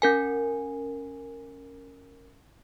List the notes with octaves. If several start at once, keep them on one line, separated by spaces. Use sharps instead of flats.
C#4 A#4 G#5